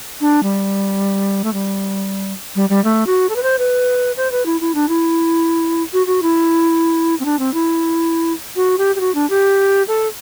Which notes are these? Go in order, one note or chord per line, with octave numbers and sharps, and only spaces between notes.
D4
G3
A3
G3
G3
G3
A3
F#4
A4
B4
C5
B4
C5
B4
E4
E4
D4
E4
F#4
F#4
E4
C4
D4
C4
E4
F#4
G4
G4
F#4
D4
G4
A4